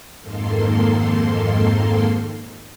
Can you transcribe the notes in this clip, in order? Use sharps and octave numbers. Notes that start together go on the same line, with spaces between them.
F2 G#2 D#3 A#3 A4 C6